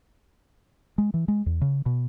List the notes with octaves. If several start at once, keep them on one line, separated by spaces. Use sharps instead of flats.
G#3
E3
G#3
E2
C#3
B2